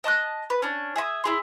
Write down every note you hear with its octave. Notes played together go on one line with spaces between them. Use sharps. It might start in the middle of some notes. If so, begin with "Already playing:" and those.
D#5 A5 D6 F#6
B4
C#4 D4
G#4 E5 B5 D#6
E4 G#4 C6